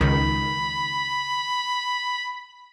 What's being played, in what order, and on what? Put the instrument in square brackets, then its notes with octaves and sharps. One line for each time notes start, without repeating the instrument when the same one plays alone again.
[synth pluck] C#2 D#3 [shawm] B5